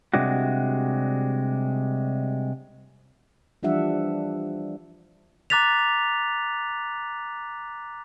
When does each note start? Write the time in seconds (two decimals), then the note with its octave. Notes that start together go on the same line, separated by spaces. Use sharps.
0.14 C3 G3 G#3 D4 F#4
3.63 E3 F3 G3 D4 E5 F#5
5.50 A#5 D6 F#6 A6 B6 F7